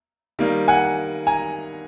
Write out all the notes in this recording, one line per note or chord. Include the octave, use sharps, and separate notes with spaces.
D#3 G3 A#3
F#5 G#5
G#5 A#5